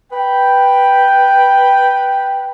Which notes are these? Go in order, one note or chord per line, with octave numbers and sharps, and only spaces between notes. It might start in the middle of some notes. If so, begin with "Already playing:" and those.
B4 G5